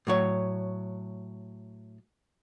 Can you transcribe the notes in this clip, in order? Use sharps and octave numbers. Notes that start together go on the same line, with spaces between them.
A2 F#3 C#5